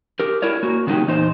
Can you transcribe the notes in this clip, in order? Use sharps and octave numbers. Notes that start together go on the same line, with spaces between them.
G4 A#4
E4 A#4 C#5 D5
A#3 F#4
C#3 F#3 A#3 D#4 G4
E2 A#2 D#4 C5